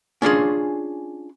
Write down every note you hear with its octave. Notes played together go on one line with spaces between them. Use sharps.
C#4 D4 F4 G#4